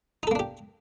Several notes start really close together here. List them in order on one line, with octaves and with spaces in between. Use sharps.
D#4 A4 A#3 D4 G4